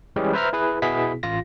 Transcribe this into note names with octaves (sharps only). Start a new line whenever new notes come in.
E3 G3 G#3 C#4 G4 G#4
B4 C5 E5 A#5 F6
E4 G#4 B4
B2 B3 E4 G#4 B6
A1 F4 A#6